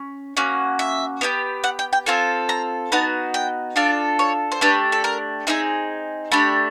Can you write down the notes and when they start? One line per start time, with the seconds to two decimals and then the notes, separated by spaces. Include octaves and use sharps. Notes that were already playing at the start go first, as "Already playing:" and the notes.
Already playing: C#4
0.37 A#3 C#4 F#4
0.79 E5
1.21 B3 E4 G4
1.64 F#5
1.79 G5
1.93 G5
2.06 C4 F4 A4 G#5
2.49 A#5
2.92 B3 D#4 F#4 A5
3.34 G5
3.76 D4 F4 A4 D5
4.19 C#5
4.52 C5
4.61 A3 D4 G4 B4
4.92 A4
5.04 A#4
5.47 C4 D#4 G#4 E5
6.32 A3 D4 G4 B5